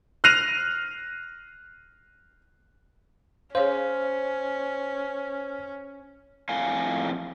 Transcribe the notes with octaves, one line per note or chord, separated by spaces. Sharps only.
F6 F#6 A#6 C7 D#7 F7
C#4 G#4 C5 C#5 F5
F2 A2 F5 G#5